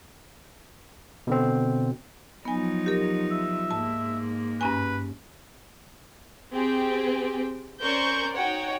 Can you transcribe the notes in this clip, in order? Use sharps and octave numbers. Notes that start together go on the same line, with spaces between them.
B2 D3 C4
F3 F#3 B3 D#4 G#5
G4 A#4
E5
G#2 A#3 A5
G2 C#4 B4 G#5
C4 G4 G#4 G5
C#4 A#4 C5 D5 C#6 G6
D#4 F#4 C#5 F#5 G5